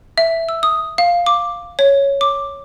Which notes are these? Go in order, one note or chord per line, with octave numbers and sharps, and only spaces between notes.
E5
E6
D#6
F5
D6
C#5
D6